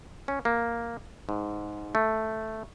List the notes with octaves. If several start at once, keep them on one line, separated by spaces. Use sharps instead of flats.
C#4
A#3
G#2
A3